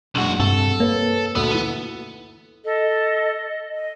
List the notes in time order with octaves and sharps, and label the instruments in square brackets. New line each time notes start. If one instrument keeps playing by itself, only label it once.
[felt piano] F#1 G#3 D4 [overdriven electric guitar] B1 F#4
[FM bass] G2 [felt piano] C3 [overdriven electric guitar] A4
[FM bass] A#3 [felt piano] B4 C#5
[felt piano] D2 A4 E6 [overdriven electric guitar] B3
[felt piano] E3 D#7
[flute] A4 [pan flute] D#5
[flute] D#5